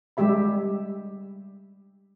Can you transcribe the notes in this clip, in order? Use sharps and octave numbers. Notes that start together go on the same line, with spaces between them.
G3 G#3 G4 E5 B5